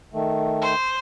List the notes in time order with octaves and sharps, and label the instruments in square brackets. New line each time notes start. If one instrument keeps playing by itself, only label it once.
[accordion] D#3 A3
[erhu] C5